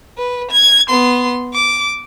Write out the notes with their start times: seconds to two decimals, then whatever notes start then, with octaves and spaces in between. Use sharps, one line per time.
0.18 B4
0.51 G#6
0.89 B3 C6
1.54 D6